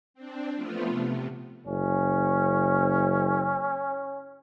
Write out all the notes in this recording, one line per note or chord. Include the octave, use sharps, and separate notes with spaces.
C4 D4
F3 A3 B3 F4
C3
F#1 C#4